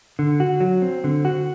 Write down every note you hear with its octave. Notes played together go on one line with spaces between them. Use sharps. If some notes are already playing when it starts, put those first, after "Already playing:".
D3
F#4
F#3
C4
D3
F#4